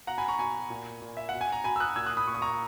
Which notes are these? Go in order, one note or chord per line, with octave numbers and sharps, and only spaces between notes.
B2 F#5 A#5
G#5 B5
A#5 C#6
B2 G#5 B5
A#2
A#2
E5
B2 F#5
G#5
A#5
B2 G#5 B5
E6
D#6 F#6
A#2 E6 G#6
D#6 F#6
B5 D#6
A#2 C#6
D#6
A#5 C#6